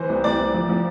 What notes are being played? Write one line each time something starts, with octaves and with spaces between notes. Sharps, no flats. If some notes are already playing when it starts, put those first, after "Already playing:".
Already playing: E3 C5
C2
C2 D5
C2
F3
F3